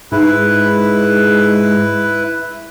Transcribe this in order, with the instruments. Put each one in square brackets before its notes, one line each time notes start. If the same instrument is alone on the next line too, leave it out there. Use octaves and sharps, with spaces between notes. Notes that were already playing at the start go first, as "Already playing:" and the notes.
[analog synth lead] G#2 [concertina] E4 B4